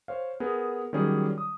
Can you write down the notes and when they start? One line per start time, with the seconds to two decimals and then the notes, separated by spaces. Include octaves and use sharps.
0.08 C5 C#5 F5
0.40 B3 G#4 A#4
0.93 D#3 F#3 G3 C#4 G#4 D5
1.38 D#6